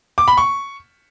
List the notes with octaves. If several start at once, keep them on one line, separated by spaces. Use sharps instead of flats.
D6
B5
C#6